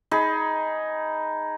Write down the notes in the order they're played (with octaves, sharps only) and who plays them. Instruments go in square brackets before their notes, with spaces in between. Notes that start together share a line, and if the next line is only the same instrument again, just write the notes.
[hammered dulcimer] D#4 G#4 B5